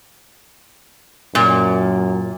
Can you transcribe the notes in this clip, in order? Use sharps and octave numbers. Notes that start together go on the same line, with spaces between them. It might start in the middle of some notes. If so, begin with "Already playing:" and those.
F#2 A#2